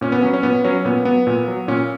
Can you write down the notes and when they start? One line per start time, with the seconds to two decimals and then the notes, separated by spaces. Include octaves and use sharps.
0.01 A#2 C#4
0.12 B3
0.22 F#3 C#4
0.34 C#4
0.43 A#2 B3
0.64 F#3 C#4
0.85 A#2 B3
1.05 F#3 B3
1.27 A#2
1.48 F#3
1.68 A#2 C#4